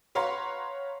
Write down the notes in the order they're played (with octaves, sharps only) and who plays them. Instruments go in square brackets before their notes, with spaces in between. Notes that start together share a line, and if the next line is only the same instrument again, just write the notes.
[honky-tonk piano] B4 C#5 F5 F#5 A#5 C6